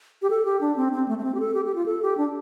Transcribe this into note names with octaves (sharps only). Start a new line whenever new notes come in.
G4
A4
G4
D4
C4
C4
A3
A3
C4
G4
A4
G4
G4
F4
A4
G4
D4